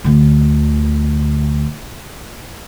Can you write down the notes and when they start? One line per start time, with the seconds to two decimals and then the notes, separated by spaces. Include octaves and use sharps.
0.04 D2 D3